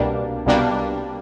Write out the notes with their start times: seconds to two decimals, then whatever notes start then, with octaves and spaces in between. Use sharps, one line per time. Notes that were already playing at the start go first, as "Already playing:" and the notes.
Already playing: C2 B2 G3 A#3 D4
0.46 C2 B2 G3 A#3 D4